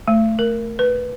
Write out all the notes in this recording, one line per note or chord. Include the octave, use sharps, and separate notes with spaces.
A3
A#4
B4